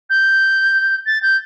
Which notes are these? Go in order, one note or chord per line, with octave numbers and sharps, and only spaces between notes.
G6
A6
G6